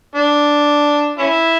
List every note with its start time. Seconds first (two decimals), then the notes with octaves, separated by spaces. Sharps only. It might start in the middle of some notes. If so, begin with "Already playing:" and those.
0.16 D4
1.19 C#4 E4